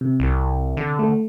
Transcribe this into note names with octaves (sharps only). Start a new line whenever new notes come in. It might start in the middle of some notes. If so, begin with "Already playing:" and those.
C3
C2
D3
A3